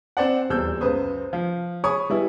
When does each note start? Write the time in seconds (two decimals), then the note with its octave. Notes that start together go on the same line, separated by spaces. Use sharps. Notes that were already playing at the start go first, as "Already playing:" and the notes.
0.17 C4 C5 D5 F#5
0.50 D#1 E2 E6 G6
0.81 C#2 F#2 B4 C5 D#6
1.33 F3
1.84 G#4 C#5 G#5 B5 C#6 D#6
2.10 G3 G#3 B3 E4